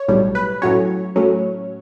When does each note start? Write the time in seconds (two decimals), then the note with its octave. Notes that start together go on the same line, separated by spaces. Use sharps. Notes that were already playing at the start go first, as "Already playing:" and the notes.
Already playing: C#5
0.08 B1 A2 G3
0.35 B4
0.62 A2 F#3 C#4 C#5
1.16 A2 F#3 C#4